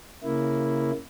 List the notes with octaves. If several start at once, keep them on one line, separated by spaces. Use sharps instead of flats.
C#3 A#3 E4